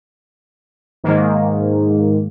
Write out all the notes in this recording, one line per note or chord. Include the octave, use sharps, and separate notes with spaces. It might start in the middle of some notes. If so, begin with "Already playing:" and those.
G#2 D#3 A#3